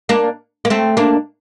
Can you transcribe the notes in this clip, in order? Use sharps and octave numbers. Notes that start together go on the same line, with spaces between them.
A#3 D4
A#3
A3 C4
A#3 D4